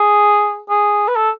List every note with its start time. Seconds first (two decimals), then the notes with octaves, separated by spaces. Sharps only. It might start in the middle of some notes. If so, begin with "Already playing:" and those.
Already playing: G#4
0.70 G#4
1.08 B4
1.16 A4